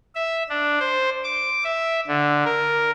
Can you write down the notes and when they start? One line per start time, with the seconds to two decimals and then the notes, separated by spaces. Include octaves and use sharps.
0.15 E5
0.49 D4
0.80 C5
1.24 D6
1.64 E5
2.07 D3
2.45 A#4